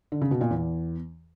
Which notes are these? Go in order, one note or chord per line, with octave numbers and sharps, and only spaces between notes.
D3
C#3
B2
A#2
E2